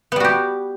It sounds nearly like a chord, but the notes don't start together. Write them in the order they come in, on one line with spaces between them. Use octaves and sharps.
B3 G3 F#4 G4